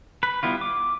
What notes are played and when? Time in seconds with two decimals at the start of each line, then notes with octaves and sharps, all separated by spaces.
0.23 B4
0.43 G3 B3 E4 F4
0.61 D6